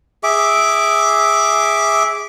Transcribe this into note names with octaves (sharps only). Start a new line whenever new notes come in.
G#4 E5 D6